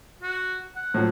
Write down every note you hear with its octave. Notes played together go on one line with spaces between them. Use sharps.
F#4
F#5
A2 F3 F#3